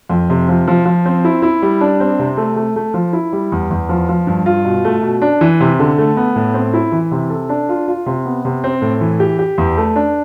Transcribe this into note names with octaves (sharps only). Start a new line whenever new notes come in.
F2
C3
F3
F3
F3
C4
E4
E4
G3
D4
C4
C3
A3
A3
A3
F3
E4
G3
E2
E2
F3
F3
G2
F4
B2
A3
B2
D4
E3
C3
D3
A3
B3
A2
C4
E4
E3
C3
A4
D4
F4
F4
C3
B3
C3
C4
A2
E3
G4
G4
E2
A3
D4